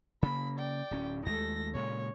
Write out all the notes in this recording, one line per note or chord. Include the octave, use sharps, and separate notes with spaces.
C#3 A#3 B5
D5 G5
D1 C#4
D#2 G#3 A3 A4 A#6
A#2 C#3 G#3 C#5